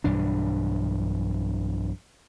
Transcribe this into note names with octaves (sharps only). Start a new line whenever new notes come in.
B1 G2 E3 D4